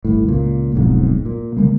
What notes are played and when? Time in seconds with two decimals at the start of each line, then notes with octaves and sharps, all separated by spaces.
0.05 G1 A2
0.27 C#2 A#2
0.75 D1 B1 F2 G#2
1.25 A#2
1.57 D3 F3 G#3 A#3